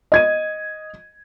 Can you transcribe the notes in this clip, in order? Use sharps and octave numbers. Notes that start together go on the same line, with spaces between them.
D#5 G#6 D#7